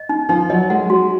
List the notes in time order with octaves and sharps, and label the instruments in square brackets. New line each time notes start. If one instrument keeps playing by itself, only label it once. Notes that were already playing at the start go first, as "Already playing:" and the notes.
Already playing: [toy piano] D#5
D#4
[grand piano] F3 [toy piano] D#4
[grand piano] F#3 [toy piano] D#5
[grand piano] G#3 [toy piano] F#5
[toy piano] F#4